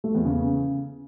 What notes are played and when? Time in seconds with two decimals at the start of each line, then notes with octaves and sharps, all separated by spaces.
0.04 A3
0.15 E2
0.25 C#3